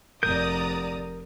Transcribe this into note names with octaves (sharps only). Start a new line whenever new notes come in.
F1 A#4 D5 A#5 D#6 G6